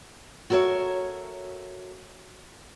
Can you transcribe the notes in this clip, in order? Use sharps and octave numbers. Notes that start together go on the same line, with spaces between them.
F#4 A4 A#4 C5 C#5 E5